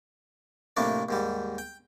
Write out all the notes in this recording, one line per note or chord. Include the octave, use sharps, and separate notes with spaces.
F2 A2 C3 A3 A#3 D4
D#2 G#2 G3
G5